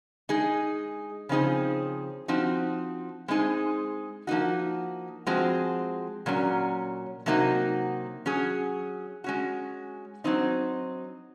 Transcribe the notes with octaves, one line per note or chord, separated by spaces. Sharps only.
G#3 D#4 G#4
C#3 F3 C4 D#4 G#4
F3 C4 D#4 F#4
G#3 C4 D#4 G#4
F3 A#3 D#4 F#4
F3 G#3 C4 F#4
A#2 F#3 C#4
C3 F#3 A#3 D#4 F#4
F#3 C#4 G#4
G#3 C#4 F#4
F#3 C4 D#4